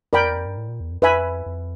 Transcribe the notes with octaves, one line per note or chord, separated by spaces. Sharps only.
F2 A#4 D5 G5 B5
E2
F2
G2
A2
A#2
E2
F2
F2 B4 E5 G#5 B5
F2